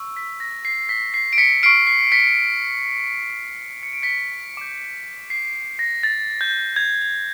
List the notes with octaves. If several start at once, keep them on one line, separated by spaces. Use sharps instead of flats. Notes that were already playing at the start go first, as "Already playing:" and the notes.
Already playing: C#6 E6
B6
A#6
C7
B6
C7
D7
B6 C#7
C#6 F6 C7 D7
C7
B6 C#7
C#7
D7
B6 C#7
D6 G6
C7
A#6
A6
G6
G#6
G#6